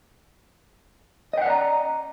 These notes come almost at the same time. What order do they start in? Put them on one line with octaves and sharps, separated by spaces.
D#5 G5 F#5 D5 A#5